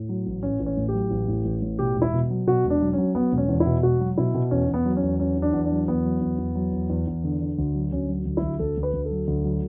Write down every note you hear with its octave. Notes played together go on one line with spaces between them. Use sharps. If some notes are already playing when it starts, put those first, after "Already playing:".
Already playing: A2
F#3
A1
A1 C#4
A1
C#4
A2
G4
F#3
A1
A2
A1
A2
B2 G4
E1
E4
B2
F#3
B2 F#4
E1
D4
F#3
F#3 C#4
F#3 B3
E1
C#4
E2
E4
B2
E1 F#4
F#3
B2 E4
B2
E2 C#4
E2 B3
F#3
C#4
E2
F#3 C#4
E2
D4
E2
D4
F#3
E2 B3
F#3
E2
E2
F#3
E2
E2
E2
D3
D3
D2
F#3
D2 C#4
F#3
D2
D2 E4
D2 A4
D2
B4
D2
A4
F#3
D2
F#3